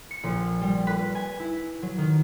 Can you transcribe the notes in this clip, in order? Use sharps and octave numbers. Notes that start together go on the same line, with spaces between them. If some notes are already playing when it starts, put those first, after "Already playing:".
C#7
A#1
G3
B4
G#5
E4
F#3
D#3